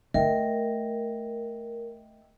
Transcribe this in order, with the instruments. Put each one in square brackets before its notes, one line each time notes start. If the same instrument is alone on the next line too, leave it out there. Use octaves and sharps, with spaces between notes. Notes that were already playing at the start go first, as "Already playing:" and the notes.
[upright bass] A3 [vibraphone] A#4 [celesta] D#5 E5 G5